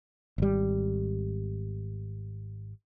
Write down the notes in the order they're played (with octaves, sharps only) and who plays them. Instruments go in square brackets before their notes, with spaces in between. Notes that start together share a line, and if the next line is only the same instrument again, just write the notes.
[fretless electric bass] G#1 G3